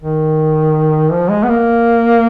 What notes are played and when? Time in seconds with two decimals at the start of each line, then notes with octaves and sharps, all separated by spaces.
0.01 D#3
1.11 F3
1.30 G#3
1.43 B3
1.49 A#3